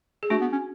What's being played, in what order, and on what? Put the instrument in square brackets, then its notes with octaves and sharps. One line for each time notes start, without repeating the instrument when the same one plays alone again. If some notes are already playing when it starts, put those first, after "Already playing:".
[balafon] G#4
[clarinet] A3 [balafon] D4 F#4
[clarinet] B3
C#4